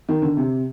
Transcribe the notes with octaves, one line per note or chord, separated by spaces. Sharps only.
D#3
D3
C3